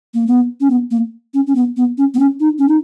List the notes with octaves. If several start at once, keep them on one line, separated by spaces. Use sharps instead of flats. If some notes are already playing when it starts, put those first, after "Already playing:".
A#3
B3
C#4
B3
A#3
C#4
C#4
B3
B3
C#4
B3
C#4
D#4
C#4
D#4